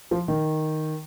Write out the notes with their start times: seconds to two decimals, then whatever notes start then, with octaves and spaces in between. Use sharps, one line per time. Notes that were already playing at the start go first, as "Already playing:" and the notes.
0.11 F3
0.28 D#3